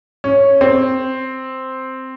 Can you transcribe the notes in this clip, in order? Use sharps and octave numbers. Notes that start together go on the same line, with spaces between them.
C#4
C4